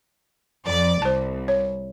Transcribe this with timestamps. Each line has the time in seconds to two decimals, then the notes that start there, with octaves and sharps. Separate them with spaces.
0.67 F2 D5
1.02 C2 C5 A5
1.48 C#5